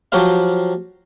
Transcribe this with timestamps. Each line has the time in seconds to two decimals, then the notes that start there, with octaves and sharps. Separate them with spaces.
0.12 F3 F#3 F#4 G4 C5 F5